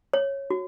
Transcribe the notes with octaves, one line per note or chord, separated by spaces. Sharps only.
C#5
F#4